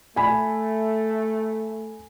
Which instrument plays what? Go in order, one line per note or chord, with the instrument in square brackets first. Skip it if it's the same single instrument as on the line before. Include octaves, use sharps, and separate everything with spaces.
[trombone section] A3 [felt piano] G#5 B5